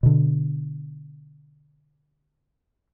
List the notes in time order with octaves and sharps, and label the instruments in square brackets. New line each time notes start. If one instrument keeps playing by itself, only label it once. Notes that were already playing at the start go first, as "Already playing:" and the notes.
[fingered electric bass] B2 D3